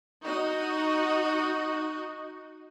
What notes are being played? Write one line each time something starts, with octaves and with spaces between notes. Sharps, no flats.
D#4 F#4 D#5